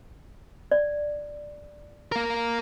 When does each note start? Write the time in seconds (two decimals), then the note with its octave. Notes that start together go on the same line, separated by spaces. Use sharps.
0.71 D5
2.12 A#3 A#4